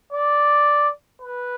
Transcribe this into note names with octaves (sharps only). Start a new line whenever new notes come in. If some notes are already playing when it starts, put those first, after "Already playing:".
D5
B4